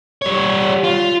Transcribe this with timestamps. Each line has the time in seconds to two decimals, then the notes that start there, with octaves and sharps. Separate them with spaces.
0.22 G3 C#5
0.84 F4